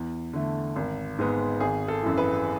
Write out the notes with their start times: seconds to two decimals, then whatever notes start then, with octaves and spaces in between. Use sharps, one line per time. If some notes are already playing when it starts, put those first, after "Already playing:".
Already playing: E2
0.33 D3 A3
0.76 G#1
1.19 G#2 G#3 B3
1.60 G#1 G#4
1.88 A4
2.03 F#2 E3
2.18 B4